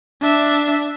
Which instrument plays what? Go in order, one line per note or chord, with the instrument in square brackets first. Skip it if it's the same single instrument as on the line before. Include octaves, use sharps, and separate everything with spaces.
[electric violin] D4 E5